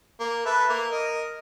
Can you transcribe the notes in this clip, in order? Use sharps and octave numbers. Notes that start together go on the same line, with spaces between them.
A#3
A4 B4 E5
A#3
A#4 D#5